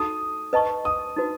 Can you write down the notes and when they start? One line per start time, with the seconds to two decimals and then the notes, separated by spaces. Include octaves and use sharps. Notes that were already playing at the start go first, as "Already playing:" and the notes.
Already playing: D#4 F#4 A4 D#6
0.53 B4 D#5 A5 C#6
0.85 D#6
1.16 D#4 F#4 B4